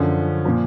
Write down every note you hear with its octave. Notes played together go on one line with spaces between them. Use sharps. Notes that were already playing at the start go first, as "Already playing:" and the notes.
Already playing: F#2 D3 F3 C#4
A#2 F3